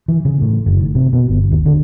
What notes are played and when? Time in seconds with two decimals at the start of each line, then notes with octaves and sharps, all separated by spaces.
0.08 E3
0.25 C#3
0.42 A2
0.66 F#1
0.80 D#3
0.95 C3
1.13 B2
1.29 G1
1.51 D#2
1.66 D3